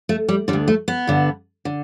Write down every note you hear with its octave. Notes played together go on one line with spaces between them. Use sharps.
A3
G3
D3 G3
D2
A3
B3
G2 D3
D3